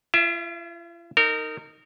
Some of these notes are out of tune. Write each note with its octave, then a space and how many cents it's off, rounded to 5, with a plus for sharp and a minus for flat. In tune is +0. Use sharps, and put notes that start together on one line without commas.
F4 -45 E5 +0
D#4 +0 A#4 -25